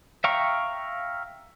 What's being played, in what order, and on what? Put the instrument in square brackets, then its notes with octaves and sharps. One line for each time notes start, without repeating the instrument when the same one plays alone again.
[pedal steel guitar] E5 F5 G5 A#5 C#6